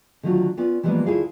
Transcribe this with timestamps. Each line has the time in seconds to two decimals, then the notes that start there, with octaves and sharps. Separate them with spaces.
0.23 D3 D#3 F#3 A3 F4 F#4
0.57 B3 C#4 F4 D5
0.83 E3 F3 G3 G#3 A#3 B3
1.06 D2 E4 F4 G#4 A#4 F5